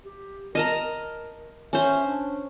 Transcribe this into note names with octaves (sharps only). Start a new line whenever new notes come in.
G4
A#4 D#5 A5 A#5
A#4
C#4 C5 E5
D4